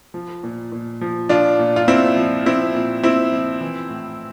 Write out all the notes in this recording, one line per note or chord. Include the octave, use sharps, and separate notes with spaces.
F3
A#2
A#2
F3
F3 D4 F4
A#2
F4
A#2 C4 E4
F3
F3 C4 E4
A#2
A#2 C4 E4
F3
E3
A2